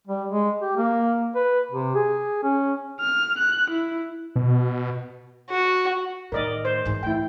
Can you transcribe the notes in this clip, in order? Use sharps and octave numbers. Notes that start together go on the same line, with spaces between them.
G3
G#3
G4
A#3
B4
C3
G#4
C#4
F6
F#6
E4
B2
F#4
A2 D#3 A#4 D5 D#5
C5
G#2 E3
A3 E4 G5